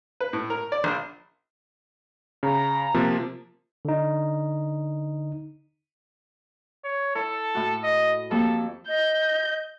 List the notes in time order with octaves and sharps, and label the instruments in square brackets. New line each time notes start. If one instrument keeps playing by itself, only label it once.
[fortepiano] B4
A2
A#4
D5
A#1
[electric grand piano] C#3 [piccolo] A#5
[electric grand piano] C3 F3 A#3
[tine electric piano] D3 D#4
[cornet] C#5
[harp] E4 [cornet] A4
[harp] A2 F#4
[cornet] D#5
[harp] F2 A#3 G4 [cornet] A4
[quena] D#5 [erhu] G6